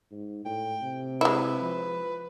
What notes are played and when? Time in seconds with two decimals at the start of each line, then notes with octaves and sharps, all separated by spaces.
0.12 G#2
0.45 A2 G5
0.82 C3
1.21 G#3 E4 B4
1.62 F3